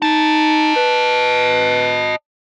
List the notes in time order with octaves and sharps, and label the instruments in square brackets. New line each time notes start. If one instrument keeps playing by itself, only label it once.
[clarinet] D#4 [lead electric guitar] D#5 A5
[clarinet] B4